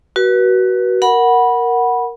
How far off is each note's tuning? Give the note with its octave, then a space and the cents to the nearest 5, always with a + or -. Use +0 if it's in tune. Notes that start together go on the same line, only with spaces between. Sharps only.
F#4 +20 B4 -35
A#4 +0 F#5 +0 B5 -15